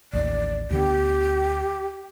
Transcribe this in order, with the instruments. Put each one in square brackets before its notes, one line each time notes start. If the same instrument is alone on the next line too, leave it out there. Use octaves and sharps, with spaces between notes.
[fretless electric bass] A1 D#2 [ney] D5
[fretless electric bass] D2 D3 B3 [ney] G4